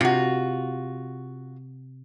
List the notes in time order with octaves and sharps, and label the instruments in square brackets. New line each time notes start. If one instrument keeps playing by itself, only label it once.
[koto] C3 [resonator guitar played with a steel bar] F4 F#4